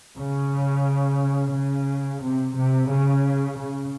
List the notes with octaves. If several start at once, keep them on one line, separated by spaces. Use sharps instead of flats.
C#3
C#3
C3
C3
C#3
C#3